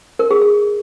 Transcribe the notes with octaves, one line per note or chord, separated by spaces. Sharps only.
A#4
G#4
G#4